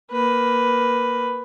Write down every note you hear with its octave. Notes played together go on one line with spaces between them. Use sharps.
A#3 B4